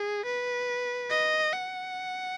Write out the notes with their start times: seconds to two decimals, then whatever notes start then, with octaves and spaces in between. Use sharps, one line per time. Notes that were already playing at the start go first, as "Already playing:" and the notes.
Already playing: G#4
0.25 B4
1.10 D#5
1.53 F#5